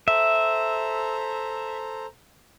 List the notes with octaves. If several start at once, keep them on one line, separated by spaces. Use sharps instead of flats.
A4 C5 E5 A#5